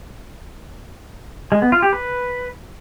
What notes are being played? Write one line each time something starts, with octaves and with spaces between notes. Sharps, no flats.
G#3
B3
F4
G4
B4